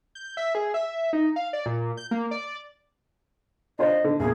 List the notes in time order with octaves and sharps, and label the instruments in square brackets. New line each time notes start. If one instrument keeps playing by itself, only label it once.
[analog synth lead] G6
E5
G#4
E5
D#4
F5
D5
A#2
G6
A#3
D5
[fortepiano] D4 F4 C5 [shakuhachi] D#5
[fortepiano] D3
[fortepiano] E2 A#2 [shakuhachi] G#4